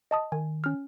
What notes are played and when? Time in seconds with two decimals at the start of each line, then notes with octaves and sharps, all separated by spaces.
0.11 D#5 A5 D#6
0.32 D#3 G#5
0.64 C#4 F6